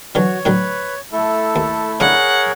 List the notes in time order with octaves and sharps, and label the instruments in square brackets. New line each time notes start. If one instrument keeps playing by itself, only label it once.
[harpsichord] D3 E3 F#3 [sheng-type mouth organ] F#4 [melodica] C#5
[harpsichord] A2 D3 F#3 [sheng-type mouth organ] B4
[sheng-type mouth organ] A3 E4 [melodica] A4
[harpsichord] D#2
[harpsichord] C#3 C#4 D4 [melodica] G#4 A#4 C#5 [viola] F#5